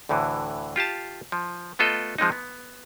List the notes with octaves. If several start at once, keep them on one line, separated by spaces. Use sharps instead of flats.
D2 A2 D3 E3
F4 G4 F5 A5
F3
A3 B3 F4 A4 D#5
F3 G#3 C4 D#4
B3